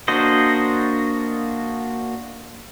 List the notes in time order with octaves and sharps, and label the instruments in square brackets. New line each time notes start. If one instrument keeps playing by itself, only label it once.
[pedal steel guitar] A#3 D4 F#4 C5 D#5